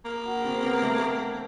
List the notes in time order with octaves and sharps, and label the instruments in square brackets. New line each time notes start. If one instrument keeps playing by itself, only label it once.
[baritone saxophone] A#3
[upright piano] F#4
C4
B3
A3